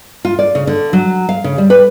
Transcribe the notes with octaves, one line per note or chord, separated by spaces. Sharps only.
F4
D5
C#3
D3
F#3
F5
C#3
G3
B4